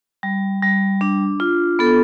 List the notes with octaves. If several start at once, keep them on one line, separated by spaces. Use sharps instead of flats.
G3
G3
D4
F4
B3 A4